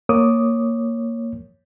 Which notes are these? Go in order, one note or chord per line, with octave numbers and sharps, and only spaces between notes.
A#3 C#5 D6 D#6